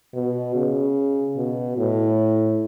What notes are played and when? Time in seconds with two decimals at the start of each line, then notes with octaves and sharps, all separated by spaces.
0.14 B2
0.55 C#3
1.37 B2
1.78 A2